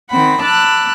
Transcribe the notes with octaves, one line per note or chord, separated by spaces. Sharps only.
D#3 C4 F#5 B5
A5 B5 D6 E6 F#6